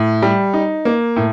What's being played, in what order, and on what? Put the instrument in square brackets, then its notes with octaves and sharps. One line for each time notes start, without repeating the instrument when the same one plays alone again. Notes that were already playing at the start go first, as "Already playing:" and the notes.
Already playing: [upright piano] A2
G3
D#4
A#3
A2